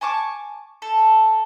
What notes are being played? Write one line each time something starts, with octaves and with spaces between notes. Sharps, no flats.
G#5 A5 C#6 D6
A4